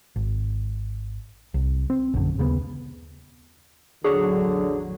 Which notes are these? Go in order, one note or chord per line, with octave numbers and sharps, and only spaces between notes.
G#1
C2
C4
A#1 F#2 D3
D#2 C#3 A3 B3
A1 E2 D3 F#3 D4 F#4 G#4 C#5